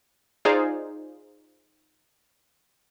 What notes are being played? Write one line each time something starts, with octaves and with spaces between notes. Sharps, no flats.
D#4 F4 G#4 C5 D5 F5